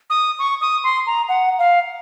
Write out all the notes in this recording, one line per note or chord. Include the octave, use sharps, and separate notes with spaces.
D#6
C#6
D#6
C6
A#5
F#5
F5